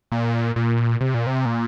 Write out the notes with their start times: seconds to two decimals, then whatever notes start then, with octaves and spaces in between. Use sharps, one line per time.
0.12 A#2
0.56 A#2
1.01 C3
1.14 A#2
1.27 C3
1.46 A#2